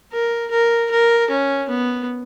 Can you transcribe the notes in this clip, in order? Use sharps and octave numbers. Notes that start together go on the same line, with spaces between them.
A#4
A#4
A#4
C#4
B3